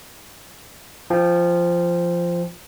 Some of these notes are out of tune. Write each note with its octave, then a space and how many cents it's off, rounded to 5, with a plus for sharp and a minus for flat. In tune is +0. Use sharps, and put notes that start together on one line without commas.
F3 -10 G5 +15